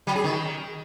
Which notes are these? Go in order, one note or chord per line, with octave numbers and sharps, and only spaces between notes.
F#3
G#4
D#3